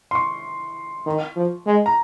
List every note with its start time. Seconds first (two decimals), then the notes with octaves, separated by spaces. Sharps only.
0.11 C6
0.15 C#6
1.06 D#3
1.36 F3
1.66 G#3
1.86 A#5